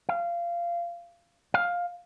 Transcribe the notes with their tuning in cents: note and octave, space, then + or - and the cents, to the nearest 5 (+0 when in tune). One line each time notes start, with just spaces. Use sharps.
F5 -20
F5 +10